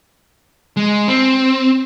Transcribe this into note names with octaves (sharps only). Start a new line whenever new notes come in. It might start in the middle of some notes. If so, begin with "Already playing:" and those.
G#3
C4